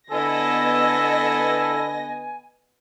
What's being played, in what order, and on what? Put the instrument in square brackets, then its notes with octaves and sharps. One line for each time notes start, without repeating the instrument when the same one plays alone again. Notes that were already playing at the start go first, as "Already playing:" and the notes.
[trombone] D3 [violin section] B3 D#5 A#6 [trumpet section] E4 A4 [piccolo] G#5